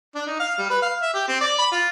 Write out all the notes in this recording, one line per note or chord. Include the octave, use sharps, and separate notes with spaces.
D4
D#4
F5
G3
B4
F5
E5
G4
C4
D5
B5
F4